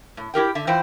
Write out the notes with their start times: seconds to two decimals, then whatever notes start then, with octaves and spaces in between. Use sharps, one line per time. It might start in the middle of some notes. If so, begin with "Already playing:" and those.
0.17 A2
0.34 E4 G4 A#4 G5
0.55 D3 E5
0.67 E3 E4 F4 C5 G5